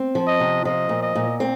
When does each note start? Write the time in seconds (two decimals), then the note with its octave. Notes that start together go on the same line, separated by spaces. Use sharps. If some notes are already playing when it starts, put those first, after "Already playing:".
Already playing: C4
0.15 F3
0.27 D#5
0.40 C3
0.65 F3 D#5
0.89 A#2
1.02 D#5
1.15 A#2
1.40 C4